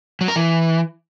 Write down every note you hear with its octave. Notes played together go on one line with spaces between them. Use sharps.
F#3
A#4
E3